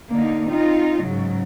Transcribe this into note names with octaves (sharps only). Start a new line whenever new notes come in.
D3 A#3 D#4
C4 D#4 F4
G#2 C#3 F#3